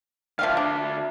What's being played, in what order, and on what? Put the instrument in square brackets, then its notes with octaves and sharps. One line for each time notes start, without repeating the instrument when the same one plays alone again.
[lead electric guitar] D3 E5 [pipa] F3 C4 F5
[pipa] D4